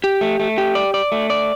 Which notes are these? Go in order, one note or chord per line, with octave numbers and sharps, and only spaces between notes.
G4
A3
A3
G4
D5
D5
A3
D5